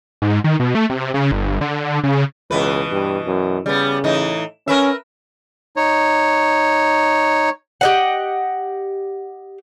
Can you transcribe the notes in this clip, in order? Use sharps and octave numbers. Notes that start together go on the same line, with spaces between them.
G#2
D#3
B2
A3
C3
C#3
G1
D3
C#3
C#2 B2 E3 B4
G2
F#2
C#3 G3 B3
A2 E3 D#4
C#4 A#4 B4 E5
D#4 C#5
G4 D#5 F#5